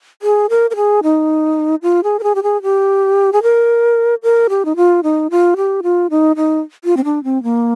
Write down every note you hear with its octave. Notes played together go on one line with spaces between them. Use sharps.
G#4
A#4
A#4
G#4
D#4
F4
G#4
A#4
G#4
G4
G#4
G4
G#4
A#4
A#4
G4
D#4
F4
D#4
F4
G4
F4
D#4
D#4
F4
C4
D4
C4
A#3